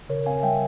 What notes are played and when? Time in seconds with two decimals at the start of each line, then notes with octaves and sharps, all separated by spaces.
0.09 C#3 A#4 C#5
0.26 C4 F5 G#5
0.43 G3 E5 G5